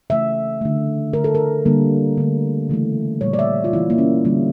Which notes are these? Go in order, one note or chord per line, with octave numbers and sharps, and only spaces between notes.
C#3 E3 A3 E5
D3 A3
D3 A3 A#4
A4
A#4
D3 G3 A#3
D3 A3
C#3 E3 A3
A#2 G3 A#3 C#5
D5
E5
F4
E3 A#3 E4
A#3
C#4
D3 G3 A#3